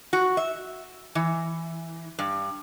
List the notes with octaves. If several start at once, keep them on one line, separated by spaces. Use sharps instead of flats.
F#4
E5
E3
G2